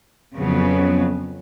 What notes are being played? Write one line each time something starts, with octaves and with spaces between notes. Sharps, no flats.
F2 C#3 F#3 B3